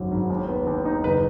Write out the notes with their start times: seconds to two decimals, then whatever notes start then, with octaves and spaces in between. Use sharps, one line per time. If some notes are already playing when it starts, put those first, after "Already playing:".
Already playing: G#1 F#2 F#3
0.12 G#1
0.30 D#2
0.48 B3
0.67 D#2
0.85 D#4
1.04 F#1 B4